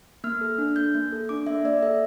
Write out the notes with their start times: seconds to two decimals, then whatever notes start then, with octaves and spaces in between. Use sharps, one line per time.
0.24 A#3 F6
0.41 A4
0.58 D4
0.76 A#3 G6
0.95 A#3
1.12 A4
1.29 D4 D6
1.47 A#3 E5
1.65 A#3 D5
1.82 A4 E5